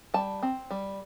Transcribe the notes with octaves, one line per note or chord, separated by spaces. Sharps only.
G3 A5
C4
G3